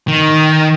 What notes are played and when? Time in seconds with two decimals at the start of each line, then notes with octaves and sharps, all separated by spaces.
0.08 D#3